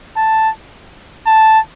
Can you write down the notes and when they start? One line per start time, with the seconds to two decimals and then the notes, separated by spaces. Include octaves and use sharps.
0.16 A5
1.26 A5